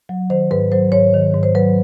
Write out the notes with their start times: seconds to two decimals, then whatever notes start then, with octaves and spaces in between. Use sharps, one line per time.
0.09 F#3
0.30 D#3 C5
0.51 G#2 B4
0.72 F#3 C5
0.92 G#2 C#5
1.14 D#3
1.34 G#2
1.43 C5
1.55 F#3 B4